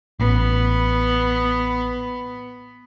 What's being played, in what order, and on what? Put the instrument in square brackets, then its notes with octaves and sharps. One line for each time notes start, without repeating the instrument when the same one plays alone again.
[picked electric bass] A1 [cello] B3